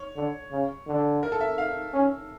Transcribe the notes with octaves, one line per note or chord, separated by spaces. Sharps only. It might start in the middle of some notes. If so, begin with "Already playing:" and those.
Already playing: C#5
D3
C#3
D3
A#4
A4
E5
F5
C#4